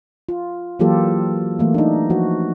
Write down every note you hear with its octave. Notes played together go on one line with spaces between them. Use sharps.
F4
E3 F#3 A#3 F4 G4 A4
E3 A3 A#3
D4 D#4
F3 F#4